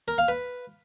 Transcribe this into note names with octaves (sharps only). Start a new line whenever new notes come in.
A#4
F5
B4